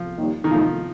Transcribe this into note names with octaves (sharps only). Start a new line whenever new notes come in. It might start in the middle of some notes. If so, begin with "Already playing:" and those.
Already playing: F3
D#2 D#3 G3 A#3 D#4
D#3
A2 F3 A3 D#4